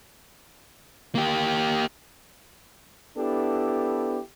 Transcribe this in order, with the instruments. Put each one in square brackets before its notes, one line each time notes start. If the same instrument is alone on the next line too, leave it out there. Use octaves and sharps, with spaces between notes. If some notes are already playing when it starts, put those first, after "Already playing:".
[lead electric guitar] A#3 G4
[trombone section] B3 D4 E4 G4 A4